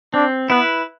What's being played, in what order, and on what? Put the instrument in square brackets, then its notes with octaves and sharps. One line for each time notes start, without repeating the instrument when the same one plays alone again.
[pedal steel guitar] C4 [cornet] D4
[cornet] B3 [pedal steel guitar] E4 B4